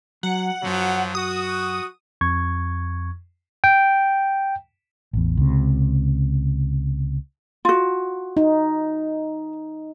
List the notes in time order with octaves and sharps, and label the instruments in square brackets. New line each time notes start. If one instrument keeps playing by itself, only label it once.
[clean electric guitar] F#3 [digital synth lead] F#5
[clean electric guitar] C2 F#2 [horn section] F3 F#3
[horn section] F#4 [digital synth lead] D#6
[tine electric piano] F2 C#6 G#6
G5
[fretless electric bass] A1 E2
C#2 C3
[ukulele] F4 F#4
[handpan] D#4